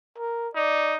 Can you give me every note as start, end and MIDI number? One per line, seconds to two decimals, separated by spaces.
0.18 0.49 70
0.55 0.98 63
0.55 0.97 74